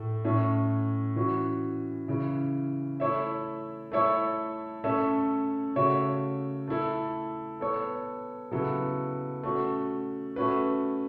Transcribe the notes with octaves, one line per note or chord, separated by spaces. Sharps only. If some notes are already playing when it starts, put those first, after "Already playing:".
Already playing: A2 A3
A2 A3 C#4
E3 C#4 F#4
C#3 E3 C#4
A3 E4 C#5 E5
A3 E4 A4 C#5 E5
A3 C#4 A4 E5
C#3 A3 F#4 C#5 E5
A3 E4 A4
B3 A4 C#5
C#3 F#3 B3 E4 A4
A3 C#4 F#4
A3 C#4 F#4 B4